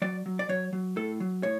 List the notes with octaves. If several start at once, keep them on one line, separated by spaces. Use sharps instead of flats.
F#3 D5
F#3
D5
F#3 C#5
F#3
A2 A4
F#3
A2 C#5